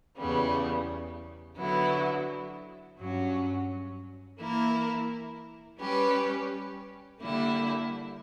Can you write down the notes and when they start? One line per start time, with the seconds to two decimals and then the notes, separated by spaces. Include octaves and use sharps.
0.17 E2 C#3 G3 B3
1.57 D3 F#3 B3 E4
2.98 G2 F#3 C#4
4.38 E3 A#3 E4 A#4
5.79 G3 C#4 G4 B4
7.20 D3 G3 A#3 E4 G4